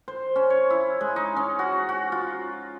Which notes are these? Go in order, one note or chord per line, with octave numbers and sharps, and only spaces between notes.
C5
C#4
C#5
E4
G#3
D#4
C#4
F#4
F#4
F4